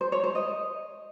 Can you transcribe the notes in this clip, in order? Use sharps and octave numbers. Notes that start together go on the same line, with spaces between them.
C5
C#5
C5
D#5